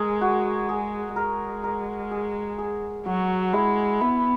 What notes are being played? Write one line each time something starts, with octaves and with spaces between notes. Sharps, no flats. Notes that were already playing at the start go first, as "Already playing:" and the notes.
Already playing: G#3 G#4 A#4
F#4
G#4
G#3 A#4
A#4
G#4
G#4
F#3 F#4
G#3 E4
B3 E4